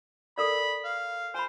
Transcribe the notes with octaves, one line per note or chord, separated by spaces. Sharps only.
A4 A#4 D5 B5
F5
C5 G#5 B5